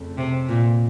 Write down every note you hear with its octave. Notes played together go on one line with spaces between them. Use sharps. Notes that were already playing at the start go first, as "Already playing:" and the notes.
Already playing: F2 C#3 A3
C3
A#2